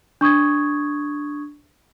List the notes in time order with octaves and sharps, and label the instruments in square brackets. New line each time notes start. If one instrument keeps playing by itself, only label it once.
[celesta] D4 C#6 D#6 G#6